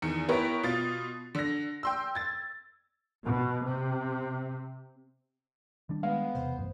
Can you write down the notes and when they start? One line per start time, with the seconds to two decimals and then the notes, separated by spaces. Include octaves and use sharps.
0.02 E2 D#3 C#7
0.29 B3 E4 G4 A#4 B4 C#5
0.63 B2 F4 A6
1.35 D3 A#6
1.83 G5 C6 E6
2.15 G#6 A6
3.25 B2
3.64 C3
5.89 D#3 G3 D4
6.03 G#3 B3 F5
6.35 E1 C3 C5
6.58 A1 F#2